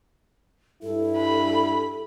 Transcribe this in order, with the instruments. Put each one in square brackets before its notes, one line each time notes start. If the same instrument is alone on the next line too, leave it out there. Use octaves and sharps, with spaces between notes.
[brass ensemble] G2 G3 E4 [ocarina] A4
[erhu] B5